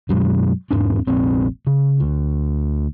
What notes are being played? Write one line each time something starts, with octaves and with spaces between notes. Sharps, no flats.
F#2 B2 F#3 G#3
E2 G#2 C4 D4
F1 A#1 C4
C#3
D2